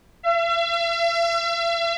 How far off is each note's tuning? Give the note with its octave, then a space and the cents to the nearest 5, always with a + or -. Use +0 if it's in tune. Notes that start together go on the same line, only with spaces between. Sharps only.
E5 +45